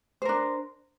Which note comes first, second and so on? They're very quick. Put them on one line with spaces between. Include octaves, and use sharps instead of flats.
C5 A#4 D4